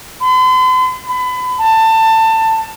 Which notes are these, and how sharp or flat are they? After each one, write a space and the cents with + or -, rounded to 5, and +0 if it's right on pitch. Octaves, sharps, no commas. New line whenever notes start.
C6 -45
B5 +30
A5 +20